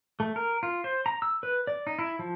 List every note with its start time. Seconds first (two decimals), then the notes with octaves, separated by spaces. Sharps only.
0.20 A3
0.36 A#4
0.63 F4
0.84 C5
1.06 A#5
1.22 E6
1.43 B4
1.67 D5
1.87 D#4
1.99 E4
2.19 F3